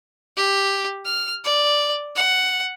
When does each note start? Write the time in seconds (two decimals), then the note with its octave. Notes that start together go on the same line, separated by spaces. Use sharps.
0.37 G4
1.05 F6
1.44 D5
2.16 F#5